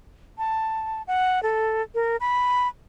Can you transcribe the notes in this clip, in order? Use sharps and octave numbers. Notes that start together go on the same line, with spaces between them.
A5
F#5
A4
A#4
B5